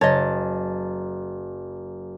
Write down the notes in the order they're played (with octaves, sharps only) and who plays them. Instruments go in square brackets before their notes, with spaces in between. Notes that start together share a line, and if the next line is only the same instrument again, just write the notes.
[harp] F#1 A5 A6 [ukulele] C#5 D#5